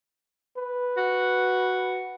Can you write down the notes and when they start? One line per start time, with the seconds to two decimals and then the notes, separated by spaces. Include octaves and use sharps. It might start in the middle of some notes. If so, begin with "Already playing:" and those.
0.58 B4
0.97 F#4